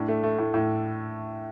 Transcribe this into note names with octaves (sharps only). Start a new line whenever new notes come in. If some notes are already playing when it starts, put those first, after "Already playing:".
Already playing: A2 D4
A3
A3
A2
A2